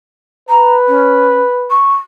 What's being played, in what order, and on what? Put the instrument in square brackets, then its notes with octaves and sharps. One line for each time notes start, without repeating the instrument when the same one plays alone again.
[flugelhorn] B4 [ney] A#5
[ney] C#4
C#6